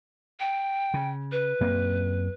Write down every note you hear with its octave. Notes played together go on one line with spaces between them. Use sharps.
G5
C#3
B4
F#2 A#3 C4